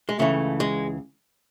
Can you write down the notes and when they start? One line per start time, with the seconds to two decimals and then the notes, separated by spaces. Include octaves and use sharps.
0.09 G#3
0.19 C#2 C#3 E3 A3
0.60 G#3